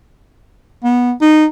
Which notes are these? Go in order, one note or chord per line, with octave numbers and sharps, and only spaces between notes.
B3
D#4